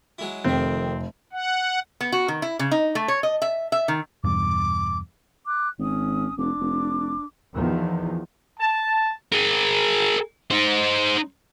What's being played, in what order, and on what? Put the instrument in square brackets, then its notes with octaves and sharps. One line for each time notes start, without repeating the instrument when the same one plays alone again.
[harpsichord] F#3 G#3 E4
[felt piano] F1 [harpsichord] F2 D#3 [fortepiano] C4
[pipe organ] F#5
[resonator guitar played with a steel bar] B3
F#4
D#3
E4
C#3
D#4
A3
C#5
D#5
E5
E5
D#3
[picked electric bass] E2 G2 B2 [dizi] D6
[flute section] D6 F#6
[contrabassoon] G#1 [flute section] C#4 D#6
[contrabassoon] F1 [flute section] D4 D6
[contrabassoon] F1
[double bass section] E2 D#3 F3
[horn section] A5
[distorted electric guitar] G#4 A#4
D#4 C5